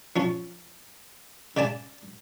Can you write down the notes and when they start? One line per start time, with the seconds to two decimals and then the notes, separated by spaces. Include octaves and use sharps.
0.16 F3 C#4
1.57 C#3 D5 G#5 A5